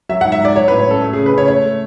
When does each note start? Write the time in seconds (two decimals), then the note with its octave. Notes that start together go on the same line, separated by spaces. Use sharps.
0.09 F#3 E5
0.21 G#2 F#5
0.32 E5
0.41 G#2 D5
0.55 F#3 C#5
0.68 A2 B4
0.79 C#5
0.87 C#4 A4
1.02 A3
1.13 C#3 G#4
1.26 B4
1.34 C#3 C#5
1.48 A3 C#5
1.64 A3